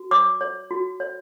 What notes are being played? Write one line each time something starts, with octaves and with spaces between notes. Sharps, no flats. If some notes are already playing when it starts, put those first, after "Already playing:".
Already playing: F#4
C#5 D6
C#5
F#4
C#5